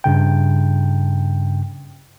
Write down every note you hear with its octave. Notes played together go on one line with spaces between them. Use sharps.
G2 C#3 G5